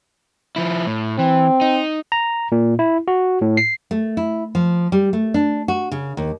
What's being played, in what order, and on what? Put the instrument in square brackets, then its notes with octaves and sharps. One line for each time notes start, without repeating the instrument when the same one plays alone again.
[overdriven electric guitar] F3 E4
A2
[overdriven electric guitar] E3 [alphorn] C4
[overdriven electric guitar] D#4
[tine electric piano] A#5
A#2
E4
F#4
A2
C7
[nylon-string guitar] A3
E4
F3
G3
A3
D4
F#4
C#3
D#2